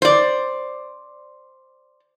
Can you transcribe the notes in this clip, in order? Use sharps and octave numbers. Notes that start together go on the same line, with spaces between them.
C5 D5